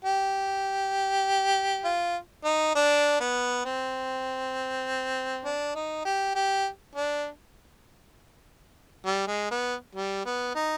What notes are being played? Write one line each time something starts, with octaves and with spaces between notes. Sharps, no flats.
G4
F4
D#4
D4
B3
C4
D4
D#4
G4
G4
D4
G3
G#3
B3
G3
B3
D#4